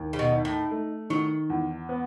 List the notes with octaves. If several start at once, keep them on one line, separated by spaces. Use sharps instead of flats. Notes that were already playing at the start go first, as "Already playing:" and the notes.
Already playing: D#2
C#3
B2
D#4
A2
A3
D#3 F#3
E2
B3